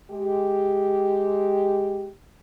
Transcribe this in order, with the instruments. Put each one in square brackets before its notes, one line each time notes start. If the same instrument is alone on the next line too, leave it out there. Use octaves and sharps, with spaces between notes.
[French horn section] G#3 G4